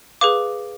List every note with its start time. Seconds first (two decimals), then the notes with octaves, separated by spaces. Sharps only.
0.21 G#4 B4 F5 D6